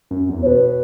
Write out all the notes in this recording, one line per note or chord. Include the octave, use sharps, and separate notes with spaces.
F#2
E2
C#5
B2 B4